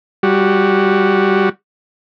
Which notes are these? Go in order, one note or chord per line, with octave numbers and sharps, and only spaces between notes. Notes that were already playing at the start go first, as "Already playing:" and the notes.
G3 F#4